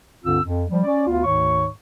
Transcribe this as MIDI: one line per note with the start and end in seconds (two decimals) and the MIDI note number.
0.24 0.39 37
0.24 0.39 43
0.24 0.39 50
0.24 0.39 60
0.24 0.39 65
0.24 0.39 88
0.43 0.63 41
0.70 0.79 53
0.70 0.79 55
0.83 1.02 61
0.83 1.02 74
1.07 1.24 38
1.07 1.24 59
1.07 1.24 65
1.24 1.66 38
1.24 1.66 44
1.24 1.66 51
1.24 1.66 73
1.24 1.66 85